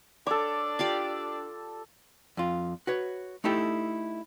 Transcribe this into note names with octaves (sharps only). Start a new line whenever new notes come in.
D4 A4 C#5 D6
F4 G4 D5
F2 F4
F#4 B4 C#5
A3 D#4 E4 G4 A4